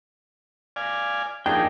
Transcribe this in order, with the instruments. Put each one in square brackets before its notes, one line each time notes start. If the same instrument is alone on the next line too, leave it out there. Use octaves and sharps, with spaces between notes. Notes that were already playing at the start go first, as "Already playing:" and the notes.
[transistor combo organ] D5 F5 G#5
[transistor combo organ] F2 G#4 [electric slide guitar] A#3 D4 D#4 [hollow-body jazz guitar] G5